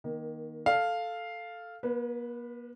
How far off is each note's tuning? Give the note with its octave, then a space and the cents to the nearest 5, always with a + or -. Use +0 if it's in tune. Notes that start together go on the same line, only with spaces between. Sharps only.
D#3 +0 A#3 +25
A4 +0 F5 +0
A#3 +45 B4 +0